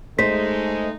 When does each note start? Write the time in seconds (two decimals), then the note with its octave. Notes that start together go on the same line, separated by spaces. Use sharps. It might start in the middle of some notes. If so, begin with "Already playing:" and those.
0.19 G#3 A3 D#4 C5 B6